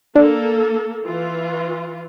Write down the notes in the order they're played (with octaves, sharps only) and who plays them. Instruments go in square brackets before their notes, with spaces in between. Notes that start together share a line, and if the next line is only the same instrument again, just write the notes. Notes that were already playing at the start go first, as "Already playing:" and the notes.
[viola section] A#3 A4 [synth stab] D4
[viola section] E3 F4